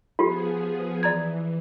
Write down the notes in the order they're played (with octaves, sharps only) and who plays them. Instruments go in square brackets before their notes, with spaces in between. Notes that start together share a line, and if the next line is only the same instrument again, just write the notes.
[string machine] F3 B3 G#4 [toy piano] F4 G4
[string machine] E3 [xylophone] D5 A#5 G#6